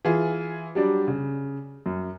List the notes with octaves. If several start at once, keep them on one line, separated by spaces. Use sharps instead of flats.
E3 F4 G#4
F#3 G3 D4
C#3
F#2